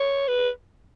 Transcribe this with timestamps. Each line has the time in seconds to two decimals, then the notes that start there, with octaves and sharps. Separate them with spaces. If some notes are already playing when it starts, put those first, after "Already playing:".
Already playing: C#5
0.28 B4